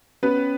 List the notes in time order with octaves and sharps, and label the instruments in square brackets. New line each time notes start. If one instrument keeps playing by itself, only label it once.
[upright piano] B3 B4 [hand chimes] C#4